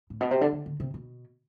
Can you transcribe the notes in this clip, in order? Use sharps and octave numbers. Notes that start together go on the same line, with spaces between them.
A2
B2
C3
D3
D3
D3
C3
B2